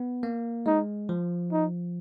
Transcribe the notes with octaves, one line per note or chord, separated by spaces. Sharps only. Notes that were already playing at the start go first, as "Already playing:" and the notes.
Already playing: B3
A#3
G#3 D#4
F3
D#4